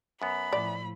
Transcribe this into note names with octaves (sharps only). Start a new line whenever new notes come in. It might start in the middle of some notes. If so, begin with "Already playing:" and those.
F#2 B3 B5
A2 F3 D5